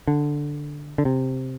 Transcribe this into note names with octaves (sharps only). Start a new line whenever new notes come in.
D3
D3
C3